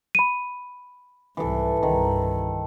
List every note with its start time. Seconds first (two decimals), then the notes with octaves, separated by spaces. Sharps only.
0.15 B5 D#7
1.37 C2 G#2 E3 A4
1.83 C2 G2 D#3